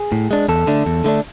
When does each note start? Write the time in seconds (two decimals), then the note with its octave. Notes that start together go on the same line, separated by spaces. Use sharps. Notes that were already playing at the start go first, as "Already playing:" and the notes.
Already playing: G#4
0.12 A2
0.31 G#3 D4
0.49 E2 A4
0.67 D3 A3 D4
0.86 E2
1.04 D3 A3 D4